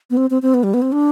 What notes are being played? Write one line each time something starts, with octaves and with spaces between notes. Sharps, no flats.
B3
C4
C4
C4
B3
G3
B3
C4
D4